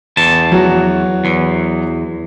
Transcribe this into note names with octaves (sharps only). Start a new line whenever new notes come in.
E2 A5
F#3 F#4
E2